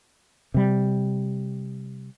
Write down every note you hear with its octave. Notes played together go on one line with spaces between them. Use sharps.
C3 G3